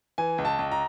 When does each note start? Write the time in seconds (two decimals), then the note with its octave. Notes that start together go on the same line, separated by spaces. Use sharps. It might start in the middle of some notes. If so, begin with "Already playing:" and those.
0.18 E3 G#5
0.38 C#2
0.45 A5
0.59 C#2
0.71 A#5